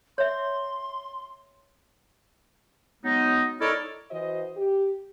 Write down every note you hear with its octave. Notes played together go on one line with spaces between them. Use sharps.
C#5 E5 C6
F#3 G#3 B3 D#4
D#4 E4 A4 A#4 C#5 D5
E3 F#4 C5 D#5
G4